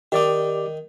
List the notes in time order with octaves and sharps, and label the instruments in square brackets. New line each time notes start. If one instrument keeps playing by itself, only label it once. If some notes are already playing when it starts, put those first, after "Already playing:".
[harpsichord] D#3 D#4 [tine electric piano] G4 D5 D6